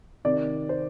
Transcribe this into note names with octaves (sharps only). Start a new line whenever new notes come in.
C3 D#3 D5
C5